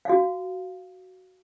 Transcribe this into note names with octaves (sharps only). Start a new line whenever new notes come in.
F#4 F5